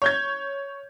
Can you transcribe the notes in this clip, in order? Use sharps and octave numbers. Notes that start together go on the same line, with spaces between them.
C#5 G6 G#6